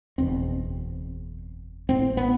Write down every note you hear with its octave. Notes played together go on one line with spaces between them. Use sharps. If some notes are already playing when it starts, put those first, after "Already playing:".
F#1 E2 B2 C4
A1 A2 C4
B3